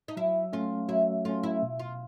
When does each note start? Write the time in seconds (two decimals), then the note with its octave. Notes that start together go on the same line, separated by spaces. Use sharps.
0.08 D#4
0.17 F#3 E4
0.53 A3 C#4 F4
0.89 F#3 E4
1.25 A3 C#4 F4
1.43 E4
1.62 B2
1.79 F4